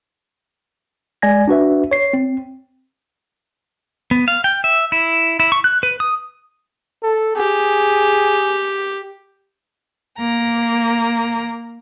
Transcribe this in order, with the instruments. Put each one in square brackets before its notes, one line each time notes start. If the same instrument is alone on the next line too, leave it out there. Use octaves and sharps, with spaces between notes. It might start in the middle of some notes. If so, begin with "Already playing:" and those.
[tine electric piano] G#3 D5 G#5 G#6 A#6
D4 F#4 B4 E5
C#5 C7
C4
[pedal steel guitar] B3
F5
G5
E5
E4
E4
C#6
F#6
B4
D#6
[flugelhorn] A4
[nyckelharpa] G4 [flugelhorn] G#4
[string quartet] A#3 A#5